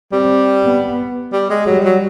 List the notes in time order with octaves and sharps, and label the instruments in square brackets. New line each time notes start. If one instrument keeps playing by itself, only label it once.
[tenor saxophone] G3 [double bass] C4
[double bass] B3
[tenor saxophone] G3
G#3
[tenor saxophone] F#3 [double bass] G3
[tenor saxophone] F#3